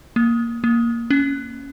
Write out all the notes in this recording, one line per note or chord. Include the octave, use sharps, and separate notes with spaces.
A#3
A#3
C#4